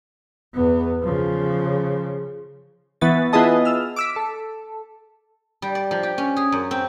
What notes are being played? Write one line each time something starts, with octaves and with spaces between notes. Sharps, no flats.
E2 B3
C#3 F3
E3 B3 E4 C#6 A6
B3 E4 F4 G#4 D#5 A5
E6 F6
D6 E6 B6
A4
G3
D5
F3
G4
C#4
G#4
F#2
C4